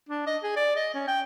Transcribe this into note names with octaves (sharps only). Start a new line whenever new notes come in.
D4
D#5
G#4
D5
D#5
C#4
G5